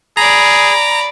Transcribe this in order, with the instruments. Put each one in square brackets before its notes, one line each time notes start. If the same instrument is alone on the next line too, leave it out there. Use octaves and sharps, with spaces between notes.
[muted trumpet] G#4 [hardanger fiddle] D5 B5 [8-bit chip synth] A#5